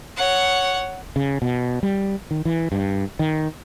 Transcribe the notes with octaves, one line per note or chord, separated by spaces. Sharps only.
C#5 F#5
C#3
B2
G3
D#3
E3
G2
D#3